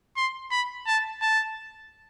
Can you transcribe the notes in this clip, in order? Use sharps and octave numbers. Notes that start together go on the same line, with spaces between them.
C6
B5
A5
A5